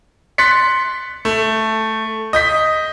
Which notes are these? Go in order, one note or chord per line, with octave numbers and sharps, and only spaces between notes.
C6 F#6 A6 B6 C#7
A3
D#5 G6 B6